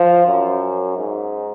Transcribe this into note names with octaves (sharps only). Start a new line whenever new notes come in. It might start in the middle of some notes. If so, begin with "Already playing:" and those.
Already playing: F3
F#2
G#2